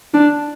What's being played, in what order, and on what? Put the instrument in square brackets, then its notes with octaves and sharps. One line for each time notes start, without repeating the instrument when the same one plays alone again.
[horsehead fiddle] D4